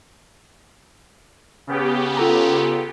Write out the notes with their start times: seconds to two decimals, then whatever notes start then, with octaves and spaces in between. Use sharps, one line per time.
1.67 C#3 B3 G4
2.17 F4 A4 A#5